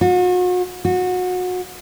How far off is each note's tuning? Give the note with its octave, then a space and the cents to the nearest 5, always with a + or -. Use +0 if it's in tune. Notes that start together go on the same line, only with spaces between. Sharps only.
F#4 -40
F#4 -25